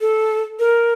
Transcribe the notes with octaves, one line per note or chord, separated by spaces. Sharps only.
A4
A#4